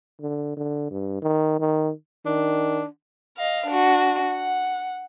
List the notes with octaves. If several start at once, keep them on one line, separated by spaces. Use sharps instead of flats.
D3
D3
G2
D#3
D#3
D#3 D4
D#5 F5
D4 F#4
F#5